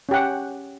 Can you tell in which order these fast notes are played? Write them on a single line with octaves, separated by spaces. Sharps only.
C#4 G4 F#5